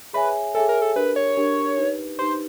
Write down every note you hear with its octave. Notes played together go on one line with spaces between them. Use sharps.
G#4 B4 C#5 E5 G#5
G#4 A4 C#5 E5 G#5
A#4
A4
D4 G4 A#4 B4
C#5
D4 G4 A#4
D#4 G4 B4
D#4 G4 B4 C5